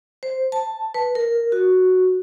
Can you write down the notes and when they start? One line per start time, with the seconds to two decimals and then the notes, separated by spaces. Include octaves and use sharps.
0.23 C5
0.52 A5
0.94 B4
1.15 A#4
1.52 F#4